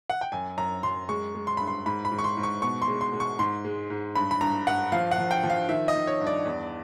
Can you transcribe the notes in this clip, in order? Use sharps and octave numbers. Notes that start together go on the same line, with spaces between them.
F#5
G5
F#2 G#5
F#2 A#5
F#2 C6
G#3 C#6
G#3
C6
G2 B5
C6
G#2 B5
B5
G#2
C#6
C6
G#2
C#6
B2 C#6
C6
G#3
C6
G#3
C#6
G#2 C6
G#3
G#2
G2 B5
B5
G2 A#5
G2 F#5
F3 F5
F#5
F3
G5
F3
F5
D#3 E5
D#5
D#3
C#5
G2
D5
E2